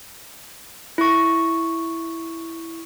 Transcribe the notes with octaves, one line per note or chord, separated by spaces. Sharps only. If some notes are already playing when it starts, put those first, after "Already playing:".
E4 C#6